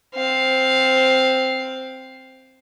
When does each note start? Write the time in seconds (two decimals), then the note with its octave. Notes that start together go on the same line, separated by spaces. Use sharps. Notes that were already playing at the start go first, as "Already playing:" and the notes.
0.14 C4 F5